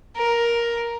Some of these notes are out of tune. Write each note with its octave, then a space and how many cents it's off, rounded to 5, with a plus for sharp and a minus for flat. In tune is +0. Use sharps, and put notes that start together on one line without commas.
A#4 +10